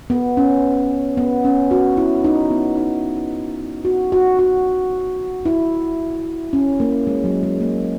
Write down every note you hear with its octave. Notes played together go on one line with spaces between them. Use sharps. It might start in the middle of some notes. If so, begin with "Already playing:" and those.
B3
C#4
B3
C#4
F#4
E4
D#4
B3
D#4
F#4
F#4
F#4
E4
C#4
A#3
G#3
F#3
G#3
A#3